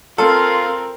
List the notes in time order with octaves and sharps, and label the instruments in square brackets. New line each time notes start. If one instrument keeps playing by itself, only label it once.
[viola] C4 A#4 [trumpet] F4 [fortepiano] A4 [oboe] F5